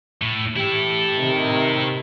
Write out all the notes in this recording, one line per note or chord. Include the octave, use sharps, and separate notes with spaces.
A2
E3 E4 G4 A4
C3 D#3